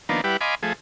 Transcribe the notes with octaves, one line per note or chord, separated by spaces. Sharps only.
D#3 F3 A#3 B3 D4
G3 E4 G4 B4 F#5
D#5 F5 G#5 B5 C6 D6
F3 A3 G#4